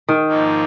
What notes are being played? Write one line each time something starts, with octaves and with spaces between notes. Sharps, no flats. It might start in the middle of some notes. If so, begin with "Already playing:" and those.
D#3
G#2 F3 A#3 D#4